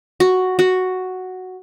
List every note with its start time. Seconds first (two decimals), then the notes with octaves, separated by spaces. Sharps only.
0.20 F#4
0.59 F#4